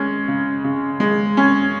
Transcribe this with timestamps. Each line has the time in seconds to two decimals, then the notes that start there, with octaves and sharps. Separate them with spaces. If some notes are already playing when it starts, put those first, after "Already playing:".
Already playing: G#3 C#4
0.28 C#3
0.64 C#3
1.00 G#3
1.37 C#4